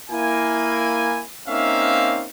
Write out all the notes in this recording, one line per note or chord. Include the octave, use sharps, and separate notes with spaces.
A#3 E4 G#5
A#3 C4 C#4 D#4 E5 F5